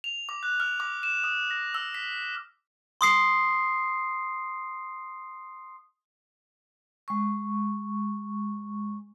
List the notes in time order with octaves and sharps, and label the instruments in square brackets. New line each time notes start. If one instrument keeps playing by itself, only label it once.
[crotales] F7
D6
F#6
F6
D6
E7
D#6
A#6
E6
B6
[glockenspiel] C6 D#6 C7
[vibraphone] G#3 C#6